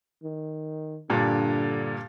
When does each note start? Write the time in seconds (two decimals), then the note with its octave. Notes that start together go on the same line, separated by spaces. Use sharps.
0.24 D#3
1.10 G2 A#2 D3